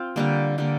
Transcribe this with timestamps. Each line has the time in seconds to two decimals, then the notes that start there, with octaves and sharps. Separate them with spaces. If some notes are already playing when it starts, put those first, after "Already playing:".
Already playing: C4 F4
0.16 D3 G3 A#3
0.58 D3 G3 A#3